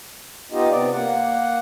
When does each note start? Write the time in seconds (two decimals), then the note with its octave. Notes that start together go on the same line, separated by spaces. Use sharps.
0.52 B3 D#4 F4 G4 D#5
0.70 C3 B3 D5
0.92 A#3 F#5